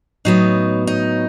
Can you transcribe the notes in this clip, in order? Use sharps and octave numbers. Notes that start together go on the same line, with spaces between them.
A2 F#3 B3 D#4
D#4